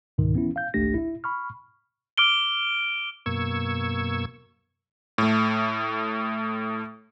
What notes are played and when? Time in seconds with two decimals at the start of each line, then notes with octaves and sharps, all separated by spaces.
0.18 C#2 G#2 B2 D#3
0.34 E3 B3 C#4 E4
0.56 F5 G6
0.74 G#1 C#2 A3 D4 G4 A#6
0.94 E4 E5
1.24 B5 C#6 F6
2.18 D6 F6 D7 G7
3.26 F#2 B2 A#3 C#6 E6 G#6
5.18 A2 A3